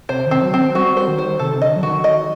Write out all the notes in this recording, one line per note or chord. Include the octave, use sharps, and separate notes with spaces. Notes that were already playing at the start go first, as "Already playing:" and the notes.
C3 C5
D#3 C4
F#3
C4
G3 F#4
C5
D#3
C5
C3 A4
D3 D#5
F#3
D#3 F#4
D#5